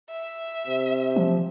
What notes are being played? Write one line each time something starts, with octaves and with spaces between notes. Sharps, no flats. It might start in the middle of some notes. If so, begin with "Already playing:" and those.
E5
C3
F3